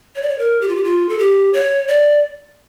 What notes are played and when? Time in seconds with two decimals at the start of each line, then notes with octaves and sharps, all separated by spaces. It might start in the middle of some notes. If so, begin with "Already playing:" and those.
0.16 C#5
0.22 D5
0.29 C#5
0.38 A#4
0.61 G4
0.68 F4
0.76 G4
0.84 F4
1.09 A4
1.19 G4
1.54 C#5
1.88 D5